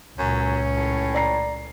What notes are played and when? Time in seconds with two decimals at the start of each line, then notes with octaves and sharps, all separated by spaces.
0.19 C#2 F#2 A#2 C#4
0.76 A2
1.14 D5 A#5 C7